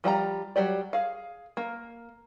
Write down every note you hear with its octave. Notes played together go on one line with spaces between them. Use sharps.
F3 G3 G5 A#5
F#3 G3 G4 D5
G#4 F5
A#3